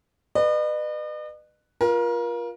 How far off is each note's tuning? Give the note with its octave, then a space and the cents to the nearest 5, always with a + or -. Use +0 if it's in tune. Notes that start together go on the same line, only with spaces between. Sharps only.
B4 +0 D#5 -45
F4 +0 A#4 +35